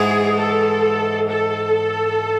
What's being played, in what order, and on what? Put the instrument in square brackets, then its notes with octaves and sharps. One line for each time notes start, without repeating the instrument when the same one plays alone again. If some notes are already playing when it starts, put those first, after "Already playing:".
Already playing: [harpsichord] G#2 E3 G#3 F#4 [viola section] G#4
[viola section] A4
A4